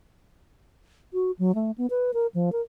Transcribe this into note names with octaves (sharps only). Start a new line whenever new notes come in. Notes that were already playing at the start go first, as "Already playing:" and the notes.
F#4
F#3
A3
B3
B4
A#4
F3
A#4